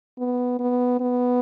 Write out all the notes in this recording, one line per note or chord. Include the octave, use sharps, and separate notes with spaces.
B3
B3
B3